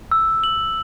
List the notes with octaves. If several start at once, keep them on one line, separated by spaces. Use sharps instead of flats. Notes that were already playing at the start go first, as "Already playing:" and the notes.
E6
F#7